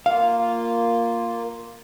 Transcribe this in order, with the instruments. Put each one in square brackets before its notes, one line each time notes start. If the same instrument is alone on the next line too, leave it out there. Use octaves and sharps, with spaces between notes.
[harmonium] A#3 F4 [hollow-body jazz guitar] F5